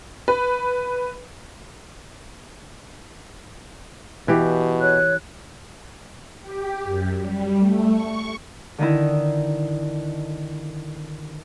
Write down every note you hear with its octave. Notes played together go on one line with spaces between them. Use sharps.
B4
B2 E3 G4
C#5 F#6
G4
F#2
G3
A3
C#6
D3 D#3 D#4 E4